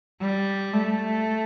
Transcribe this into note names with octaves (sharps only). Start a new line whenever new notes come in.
G3
A3